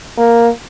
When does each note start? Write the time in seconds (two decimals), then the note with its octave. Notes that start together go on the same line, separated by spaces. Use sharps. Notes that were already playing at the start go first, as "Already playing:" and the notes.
0.18 A#3